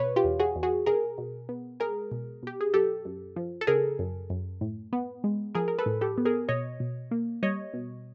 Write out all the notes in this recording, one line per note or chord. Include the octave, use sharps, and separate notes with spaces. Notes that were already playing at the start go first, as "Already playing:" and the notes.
Already playing: B2 B4 C#5
F4 G4
E2
F#4 G#4
E2
F#4 G#4
B2 G#4 A#4
B2
B3
G#3 G#4 A#4
B2
B2 G4
G#4
F#2 G4 A4
F#2
F3
A4
C#3 G#4 A#4
F#2
F#2
A2
B3
G#3
F3 G#4 A#4
A#4
A4 B4
A2
G4 A4
B3
G#4 A#4
B2 C#5 D#5
B2
A#3
G3 C#5 D#5
B2